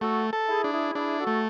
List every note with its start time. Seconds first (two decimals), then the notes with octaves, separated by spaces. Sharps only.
0.01 A3 F#4 A4
0.33 A4
0.48 E4 G#4
0.64 D4
0.71 E4 G#4
0.95 D4 E4 G#4
1.19 F#4 A4
1.27 A3